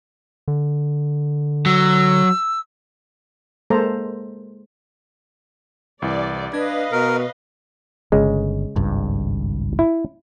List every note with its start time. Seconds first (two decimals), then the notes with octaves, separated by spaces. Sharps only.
0.48 D3
1.66 F#3 E6
3.70 G#3 A#3 A4 C5 A5 A#5
6.02 C2 E3 D5
6.53 D4 B4 D#5 F5 G#6
6.92 B2 A#4
8.12 G1 C#3 G#3
8.76 G#1 C#2 G2
9.79 E4